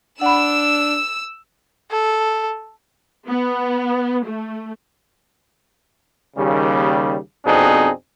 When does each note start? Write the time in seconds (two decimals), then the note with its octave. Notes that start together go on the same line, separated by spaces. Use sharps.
0.21 D4 F#5 B5 E6 E7
1.91 A4
3.28 B3
4.24 A3
6.37 D#2 C#3 G3
7.45 F2 B2 C4 D4 D#4 G#4